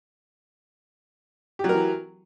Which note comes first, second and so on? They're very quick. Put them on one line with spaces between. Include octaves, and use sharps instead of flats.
G4 F#3 A#4 E3